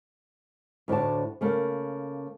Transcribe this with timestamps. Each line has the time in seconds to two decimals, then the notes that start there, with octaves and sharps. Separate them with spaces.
0.88 D2 A2 D4 C#5 A5
1.41 C#3 A3 A#3